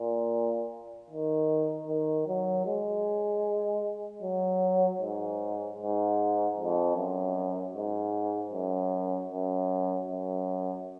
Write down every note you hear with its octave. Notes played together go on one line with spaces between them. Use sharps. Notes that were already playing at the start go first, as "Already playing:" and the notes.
Already playing: A#2
D#3
D#3
F#3
G#3
F#3
G#2
G#2
F2
F#2
G#2
F#2
F#2
F#2